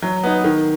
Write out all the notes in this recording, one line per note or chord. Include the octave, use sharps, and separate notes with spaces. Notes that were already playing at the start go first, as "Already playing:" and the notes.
F#3
B3 D#4
D#3